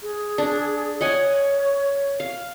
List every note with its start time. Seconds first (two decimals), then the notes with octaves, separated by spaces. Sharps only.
0.02 G#4
0.38 D4
1.01 C#5 D#5 F#5 G#5
2.20 F5